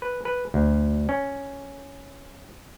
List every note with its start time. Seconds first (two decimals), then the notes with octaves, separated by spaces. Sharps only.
0.02 B4
0.25 B4
0.54 D2
1.09 C#4